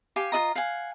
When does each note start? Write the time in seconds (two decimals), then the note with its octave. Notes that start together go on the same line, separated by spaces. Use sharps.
0.16 G4 F5 G#5 D6
0.32 F4 F#4 D#5 A#5
0.55 F5 F#5 G#5